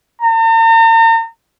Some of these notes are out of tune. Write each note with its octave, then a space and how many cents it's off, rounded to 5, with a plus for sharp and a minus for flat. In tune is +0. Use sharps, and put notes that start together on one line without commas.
A#5 -45